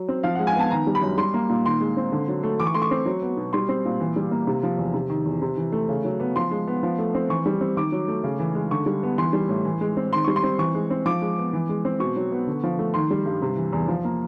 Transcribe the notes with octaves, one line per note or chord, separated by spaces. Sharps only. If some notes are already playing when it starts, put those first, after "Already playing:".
Already playing: F#3
C4
F3 F5
G#3 F#5
G#5
B3 A5
D#3 A#5
G3
B5
F#2
G3 C6
A#3
A#2
D#3 C6
G#3
C4
D3
F#3
A3
E3 D6
C#6
A3 C6
C#6
C4
F#3
B3
B2
G3 C6
C4
A#2
E3
G3
A#3
C3
F3
E2
C3
D#3
E2
C3
E3
A3
C#3
F#3
B3
F3 C6
G#3
B3
F3
A3
C4
E3 C#6
G3
C4
D#3 D6
F#3
A3
C#3
E3
G#3
D3 C#6
G3
B3
E3 C6
G3
A2
E3
G#3
C4
D#3 C6
G3 C#6
C6
C4
E3 C#6
G#3
C4
F3 D6
G#3
B3
E3
G#3
C4
B2 C#6
F#3
B3
D3
F3
A3
D#3 C6
G3
G2
C3
E3
E2
F3
A#3